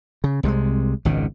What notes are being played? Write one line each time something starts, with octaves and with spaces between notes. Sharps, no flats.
C#3
C2 C3 G3 G#3
G#1 C#2 B2 D#3